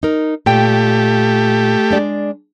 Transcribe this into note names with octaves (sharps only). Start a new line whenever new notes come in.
D#4 A#4
A#2 A3 G4 G5
G#3 D4 D5